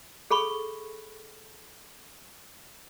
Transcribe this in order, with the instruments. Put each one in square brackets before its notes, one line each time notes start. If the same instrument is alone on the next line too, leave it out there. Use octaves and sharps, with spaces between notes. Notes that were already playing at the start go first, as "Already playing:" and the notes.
[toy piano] G#4 A4 B5 C#6